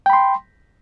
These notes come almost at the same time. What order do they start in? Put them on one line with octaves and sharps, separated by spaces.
G5 B5 C6